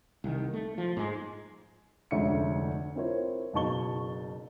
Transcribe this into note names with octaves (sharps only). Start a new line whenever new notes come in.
C2 D#3
A3
F3
G#2 G#3
F1 D2 G#3 C#4 E5 C#7
C4 E4 F4 A#4 C5 C#5
F#1 B2 D#4 A5 C#6 G7